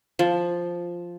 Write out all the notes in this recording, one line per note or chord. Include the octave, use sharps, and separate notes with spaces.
F3